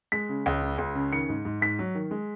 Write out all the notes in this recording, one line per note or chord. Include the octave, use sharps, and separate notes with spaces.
G#3 B6
C#3
C#2
C#3
C#2
C#3
D#3 C#7
G#2
G#2
G#2 B6
F#3
D#3
G#3